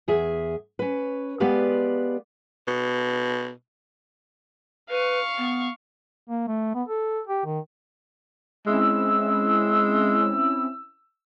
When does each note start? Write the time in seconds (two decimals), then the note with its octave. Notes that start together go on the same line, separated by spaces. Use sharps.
0.08 E2 G#4 E5
0.79 C#4 B4
1.40 G#3 B3 G4 B4 D5 F5
2.67 B2
4.90 B4 F5 C#6
5.38 B3
6.29 A#3
6.48 A3
6.75 B3
6.88 A4
7.27 G4
7.45 D#3
8.66 G#3 C4 C#4 E4 E6